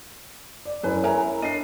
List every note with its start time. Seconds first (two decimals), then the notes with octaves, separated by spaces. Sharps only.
0.65 D5
0.83 F#2 C#4 E4 B4
1.03 E4 A#4 C#5 G#5 A#5
1.42 D4 D#5 C7 D#7